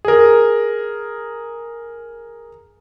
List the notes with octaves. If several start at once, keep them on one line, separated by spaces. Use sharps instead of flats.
G#4 A#4